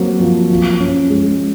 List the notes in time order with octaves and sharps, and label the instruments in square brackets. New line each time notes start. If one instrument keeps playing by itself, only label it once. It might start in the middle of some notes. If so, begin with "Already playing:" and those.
Already playing: [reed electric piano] F#3 A#3 [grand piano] C4 F#4
[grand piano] F3
F3
C#4
G#3